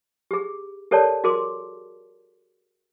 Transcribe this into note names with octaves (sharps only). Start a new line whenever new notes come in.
G4 G#4
G4 A4 A#4 C#5 D5 A5
F#4 G#4 A#4 C6 D6